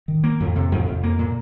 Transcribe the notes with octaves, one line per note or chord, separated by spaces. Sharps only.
D#3
A#3
F2
C3
F2
F2
A#3
A#2